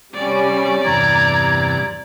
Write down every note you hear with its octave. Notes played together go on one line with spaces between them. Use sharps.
C3 G3 C#4 D5
E2 G2 C3 A#5 G#6